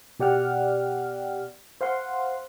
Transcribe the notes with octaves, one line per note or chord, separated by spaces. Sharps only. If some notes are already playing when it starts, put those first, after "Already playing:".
B2 G4 D5 F#5 G5 F6
C5 F5 F#5 C6